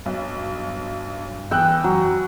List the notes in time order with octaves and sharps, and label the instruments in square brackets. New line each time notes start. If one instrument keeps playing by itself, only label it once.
[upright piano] B1 [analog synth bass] G2
[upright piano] E2 E6 F#6 [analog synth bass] E3 [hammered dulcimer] G5
[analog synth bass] F#2 [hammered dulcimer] F#3